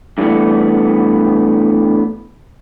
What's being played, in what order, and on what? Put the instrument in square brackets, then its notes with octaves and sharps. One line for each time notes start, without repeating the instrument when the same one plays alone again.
[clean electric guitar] G2 E3 G3 A3 B3